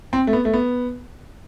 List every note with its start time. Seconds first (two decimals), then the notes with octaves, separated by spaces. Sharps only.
0.13 C4
0.27 A3
0.33 B3
0.45 A3
0.53 B3